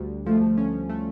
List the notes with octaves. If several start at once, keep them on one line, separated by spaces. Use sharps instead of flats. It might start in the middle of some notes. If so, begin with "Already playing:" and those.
Already playing: D2 D3 G3
F3 A3
C#4
A3